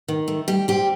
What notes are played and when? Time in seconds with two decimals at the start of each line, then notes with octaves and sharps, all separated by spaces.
0.08 D#3
0.28 A3
0.48 G3 G4
0.68 C4 G4